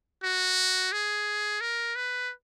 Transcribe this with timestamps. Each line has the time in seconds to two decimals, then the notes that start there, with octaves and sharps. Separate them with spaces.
0.24 F#4
0.93 G#4
1.61 A#4
1.96 B4